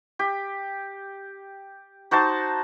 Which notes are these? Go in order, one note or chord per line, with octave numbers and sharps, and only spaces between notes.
G4
D#4 F#4 C5 A5